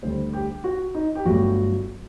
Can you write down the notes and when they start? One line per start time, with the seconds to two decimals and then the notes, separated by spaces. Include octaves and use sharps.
0.02 D2 D3 G3 C5
0.33 G4
0.64 F#4
0.95 D#4
1.15 G4
1.25 G1 G2 F#3 A3 F#4